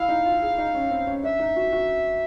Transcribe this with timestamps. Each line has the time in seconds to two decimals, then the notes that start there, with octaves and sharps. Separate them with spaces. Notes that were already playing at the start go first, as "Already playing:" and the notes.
Already playing: E4 F5
0.09 D#4
0.25 F4
0.42 G#4
0.58 D#4
0.75 C#4
0.91 C4
1.07 C#4
1.23 D4 E5
1.40 D#4
1.56 F#4
1.72 F#4